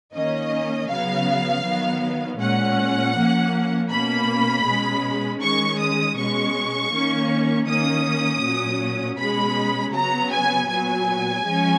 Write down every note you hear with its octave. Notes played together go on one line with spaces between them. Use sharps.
D#3 A#3 C#4 D#5
C#3 F#3 B3 F5
D#3 F#3 B3
A#2 G#3 C#4 F#5
F3 A#3 C#4
B2 A#3 C#4 B5
B2 G#3 C#4
D#3 G#3 C#4 C#6
D#6
B2 G#3 C#4 C#6
D#3 A#3 C#4
D#3 A#3 C#4 D#6
A#2 F#3 C#4
B2 G#3 C#4 B5
C#3 F#3 B3 A#5
G#5
A#2 F#3 B3 G#5
F3 G#3 C#4